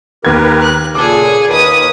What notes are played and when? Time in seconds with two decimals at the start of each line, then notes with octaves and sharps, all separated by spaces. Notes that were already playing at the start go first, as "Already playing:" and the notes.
0.25 D#2 G4 A#4 B4 G#6
0.61 F#6
0.95 A#2 C#3 G#4 A4 D6
1.48 D#2 D#3 B4 D#6